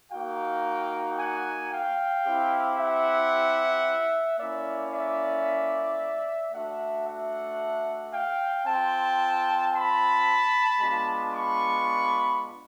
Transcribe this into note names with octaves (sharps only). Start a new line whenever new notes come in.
A#3 D#4 F#4 F5 G5
F#5 G#5
F5 G5
C4 E4 G4
E5 F#5
A#3 C#4 E4 D5 E5
D5 E5
A3 D4 F#4 E5 F#5
E5 F#5
F5 G5
C4 F4 G5 A5
A5 B5
G#3 B3 D4 F4
B5 C#6